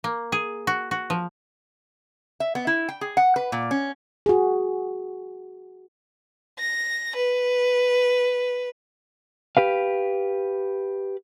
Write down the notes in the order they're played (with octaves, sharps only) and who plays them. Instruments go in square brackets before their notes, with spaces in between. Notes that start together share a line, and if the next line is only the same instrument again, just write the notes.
[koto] A#3
G#4
F#4
F#4
F3
[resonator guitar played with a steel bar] E5
B3
E4
G5
G#4
F#5
B4
A#2
C#4
[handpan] F#4 G#4
[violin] A#6
B4
[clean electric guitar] G4 B4 F5